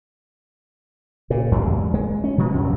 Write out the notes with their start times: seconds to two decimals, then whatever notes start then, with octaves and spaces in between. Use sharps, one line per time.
1.30 A#2 C#3
1.51 F#1 E2 G#2 G3
1.94 G#3
2.24 C#4
2.38 C3 F3 F#3 B3
2.52 A#1 F#2 C3 F#3